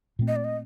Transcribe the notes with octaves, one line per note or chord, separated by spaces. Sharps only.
A#2 A3 C4
D#5
D5
D#5